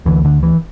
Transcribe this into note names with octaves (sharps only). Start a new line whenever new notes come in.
D2 D3 E3
D3
E3